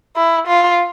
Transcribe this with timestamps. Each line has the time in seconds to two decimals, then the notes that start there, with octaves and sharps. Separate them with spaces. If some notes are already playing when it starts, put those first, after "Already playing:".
0.16 E4
0.48 F4